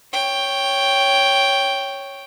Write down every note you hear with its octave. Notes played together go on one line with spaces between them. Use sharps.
C#5 G5